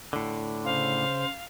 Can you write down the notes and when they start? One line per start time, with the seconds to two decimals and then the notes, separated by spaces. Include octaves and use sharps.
0.13 A2 D3
0.65 C#3 C5 F5